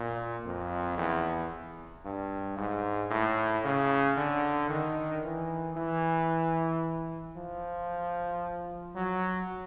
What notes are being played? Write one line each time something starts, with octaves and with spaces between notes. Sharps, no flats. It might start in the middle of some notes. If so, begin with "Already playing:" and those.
Already playing: A#2
F2
E2
G2
G#2
A2
C#3
D3
D#3
E3
E3
F3
F#3